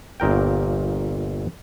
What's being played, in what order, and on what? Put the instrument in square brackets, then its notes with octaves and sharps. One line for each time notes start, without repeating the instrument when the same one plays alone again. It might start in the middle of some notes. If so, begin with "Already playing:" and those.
[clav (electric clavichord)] G1 A#2 A#4 G5